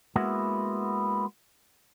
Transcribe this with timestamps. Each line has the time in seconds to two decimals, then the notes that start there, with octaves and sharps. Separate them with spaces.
0.16 G#3 A#3 B3 E4 F#4